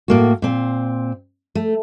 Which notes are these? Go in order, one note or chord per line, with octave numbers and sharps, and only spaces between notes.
A2 A#3 F#4
A#2 C4
A3